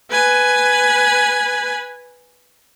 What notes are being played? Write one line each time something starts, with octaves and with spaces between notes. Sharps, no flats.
B4 G#5